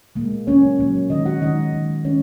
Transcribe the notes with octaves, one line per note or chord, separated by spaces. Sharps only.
A#2 G#3 A#3
A#2 F#3 A#3 C#4 C#5
A#2 F#3 A#3
D#3 G#3 D#4 D#5
F#4 F#5
D#3 G#3 D#4 D#5
D#3 G#3
D#3 G#3 C#4 C#5